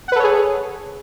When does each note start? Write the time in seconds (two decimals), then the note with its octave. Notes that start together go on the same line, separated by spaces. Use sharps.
0.08 F#5
0.12 B4
0.16 A4
0.20 C#5
0.24 G#4